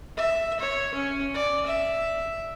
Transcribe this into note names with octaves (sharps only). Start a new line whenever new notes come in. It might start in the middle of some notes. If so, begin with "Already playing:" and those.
E5
C#5
C#4
D5
E5